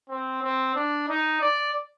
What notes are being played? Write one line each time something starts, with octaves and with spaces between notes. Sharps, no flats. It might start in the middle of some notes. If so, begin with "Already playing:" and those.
C4
C4
D4
D#4
D5